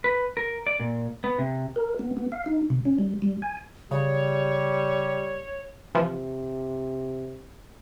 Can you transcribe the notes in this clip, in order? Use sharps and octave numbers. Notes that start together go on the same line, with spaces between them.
B4
A#4
D5
A#2
B3
C3
A#4
B3
B3
F5
D#4
C3
C#4
G3
G3
G#5
C#3 G3 C#5
C3 E3 F3